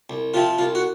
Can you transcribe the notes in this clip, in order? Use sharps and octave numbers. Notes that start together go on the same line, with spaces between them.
C2
C3 F3 C4 F4
C2 F4
F#4